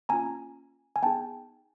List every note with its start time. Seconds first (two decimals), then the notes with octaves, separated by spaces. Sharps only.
0.09 A#3 C#4 F4 G#5 A#5
0.96 G#5
1.03 B3 D#4 G#4 G5 A5